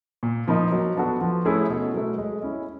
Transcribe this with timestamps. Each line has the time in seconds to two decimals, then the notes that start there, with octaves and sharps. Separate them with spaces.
0.23 A#2
0.48 F3 A#3 D#4
0.72 F#3
0.97 B3 D4 F#4 A4
1.21 F3
1.45 A3 C#4 E4 G#4
1.69 B2
1.94 F#3 A3
2.18 G#3
2.43 C#4 E4